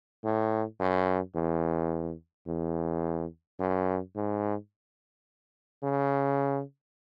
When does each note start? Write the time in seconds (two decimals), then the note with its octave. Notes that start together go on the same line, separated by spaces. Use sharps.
0.24 A2
0.80 F#2
1.35 E2
2.47 E2
3.60 F#2
4.15 G#2
5.83 C#3